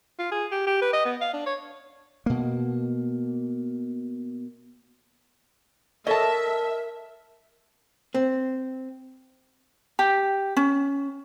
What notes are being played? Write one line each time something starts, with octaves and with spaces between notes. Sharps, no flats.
F4
G#4
G4
G4
B4
D#5
B3
F5
D4
C#5
B2 A#3
A4 A#4 C#5 D#5 E5 A5
C4
G4
C#4